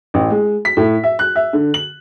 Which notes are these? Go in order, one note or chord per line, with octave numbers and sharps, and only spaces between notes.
A1
G#3
B6
A2
E5
F#6
E5
D3
F#7